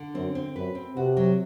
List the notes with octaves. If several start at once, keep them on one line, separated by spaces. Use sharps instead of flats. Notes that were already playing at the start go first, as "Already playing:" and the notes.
Already playing: D3
F#2 C4
C4
F#2 B4
C4
C3 F#4
F#3